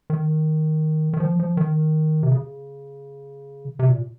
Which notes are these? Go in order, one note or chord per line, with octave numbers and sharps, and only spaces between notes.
D#3
D#3
F3
F3
D#3
C3
C#3
C3
A#2